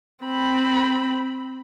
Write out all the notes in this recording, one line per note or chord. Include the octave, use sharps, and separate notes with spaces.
C4 B5